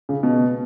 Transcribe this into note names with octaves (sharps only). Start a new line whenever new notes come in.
C#3
B2